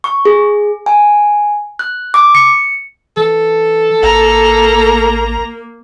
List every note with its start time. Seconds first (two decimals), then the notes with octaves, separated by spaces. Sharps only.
0.04 C#6
0.25 G#4
0.86 G#5
1.79 F#6
2.14 D6
2.35 C#7
3.17 E3 A4
4.03 A1 A#3 A#5